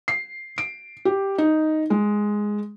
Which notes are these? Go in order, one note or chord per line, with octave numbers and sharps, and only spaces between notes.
C7
D7
G4
D#4
G#3